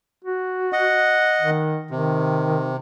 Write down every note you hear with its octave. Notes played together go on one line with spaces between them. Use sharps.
F#4
D#5 F#5
D#3
C3 D#3